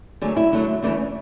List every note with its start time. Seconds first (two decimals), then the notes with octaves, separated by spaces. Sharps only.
0.22 D3 F#3 A3 G#4
0.36 E4
0.52 D3 F#3 A3
0.83 E2 C#3 E3 A3 D4